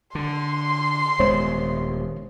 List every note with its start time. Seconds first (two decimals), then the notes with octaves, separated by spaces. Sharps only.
0.15 D3 C6
1.19 D#1 G#3 B3 C5 C#5